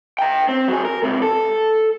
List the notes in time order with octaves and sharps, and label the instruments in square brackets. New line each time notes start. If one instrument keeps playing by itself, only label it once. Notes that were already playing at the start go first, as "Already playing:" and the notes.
[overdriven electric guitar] G5 A#5
C4
F#3 G#4
A#4
C#2 C3
A4